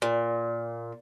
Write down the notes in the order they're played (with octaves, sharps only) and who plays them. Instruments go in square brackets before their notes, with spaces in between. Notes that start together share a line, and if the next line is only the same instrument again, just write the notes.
[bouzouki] A#2